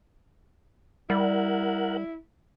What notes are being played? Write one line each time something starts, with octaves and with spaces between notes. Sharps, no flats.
G3 E4 A#4 F#5